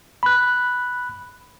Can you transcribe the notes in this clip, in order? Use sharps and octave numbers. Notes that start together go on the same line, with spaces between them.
B5 F#6